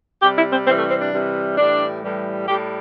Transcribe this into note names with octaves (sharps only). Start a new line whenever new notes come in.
C3 G3 G4
E4
C4
C3 E3 G3 C4
A3
C4
D4
C3 E3 G3
A2 E3 G3 D4
A2 E3 G3
A2 G3 G4